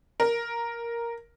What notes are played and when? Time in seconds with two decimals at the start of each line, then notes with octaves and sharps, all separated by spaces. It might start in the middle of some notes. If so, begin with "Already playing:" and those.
0.20 A#4